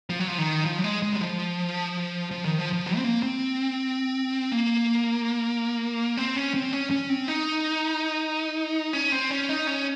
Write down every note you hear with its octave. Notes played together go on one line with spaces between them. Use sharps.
F3
F#3
F3
D#3
F3
F#3
G#3
G#3
F#3
F3
F3
D#3
F3
F3
F#3
C4
A#3
C4
A#3
C4
C#4
C4
C#4
C#4
C4
D#4
C#4
C4
C#4
D#4
C#4